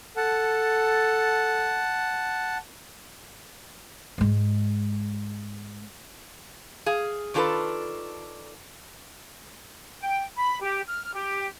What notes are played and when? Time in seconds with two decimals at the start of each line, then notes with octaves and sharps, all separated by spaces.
0.17 A4 F#5 A5
4.18 G#2 G#3
6.86 G#4 F5
7.34 D#3 D4 F4 G4 A4 B4
10.01 G5
10.36 B5
10.61 G4
10.87 F6
11.13 G4